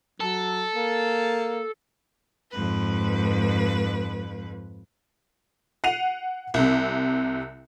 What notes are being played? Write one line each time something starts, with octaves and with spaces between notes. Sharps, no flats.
F#3 A4
A#3
F2 G#2 B4
F#5 C7 D#7 F7
C2 C3